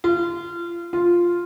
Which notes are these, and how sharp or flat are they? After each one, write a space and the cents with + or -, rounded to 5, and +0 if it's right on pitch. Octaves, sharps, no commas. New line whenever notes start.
F4 -25
F4 +0